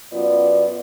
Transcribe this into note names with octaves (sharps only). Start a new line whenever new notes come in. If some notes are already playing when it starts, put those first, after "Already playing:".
F#2 B3 F4 D5